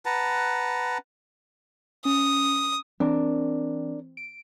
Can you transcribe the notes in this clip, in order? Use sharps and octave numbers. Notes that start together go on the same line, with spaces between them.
B4 F#5 A5 A#5
C#4 D#6
E3 C4 D4 A#4
D7